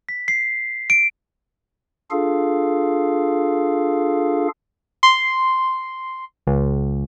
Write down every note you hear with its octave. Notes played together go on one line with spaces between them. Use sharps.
B6
C7
D7
D4 F4 G#4 A4 F5
C6
C#2